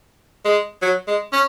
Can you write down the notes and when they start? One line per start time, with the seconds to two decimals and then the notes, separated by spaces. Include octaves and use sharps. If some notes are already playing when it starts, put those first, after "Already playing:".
0.45 G#3
0.82 F#3
1.08 G#3
1.33 C#4